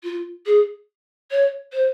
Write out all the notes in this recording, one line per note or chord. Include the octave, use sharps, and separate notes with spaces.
F4
G#4
C#5
C5